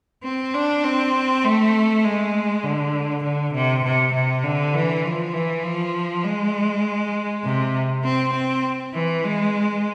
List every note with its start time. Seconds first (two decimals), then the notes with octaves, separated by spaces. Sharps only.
0.24 C4
0.54 D4
0.84 C4
1.44 A3
2.04 G#3
2.63 D3
3.24 D3
3.54 C3
3.85 C3
4.14 C3
4.44 D3
4.74 E3
5.04 F3
5.33 E3
5.63 F3
6.24 G#3
7.44 C3
8.04 C4
8.34 C4
8.94 E3
9.24 G#3